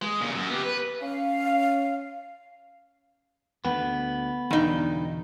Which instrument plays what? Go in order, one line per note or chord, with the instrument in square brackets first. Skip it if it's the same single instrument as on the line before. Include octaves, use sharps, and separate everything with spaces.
[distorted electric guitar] G#3
A#2 C#3
F#2
B3 G4
B4
[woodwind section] C#4 F5
[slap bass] D2 [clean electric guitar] B3
[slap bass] E2 B2 D3 [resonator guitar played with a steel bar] G2 D#4